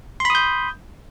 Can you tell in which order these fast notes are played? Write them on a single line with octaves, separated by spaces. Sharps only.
C6 B5 D#6 G6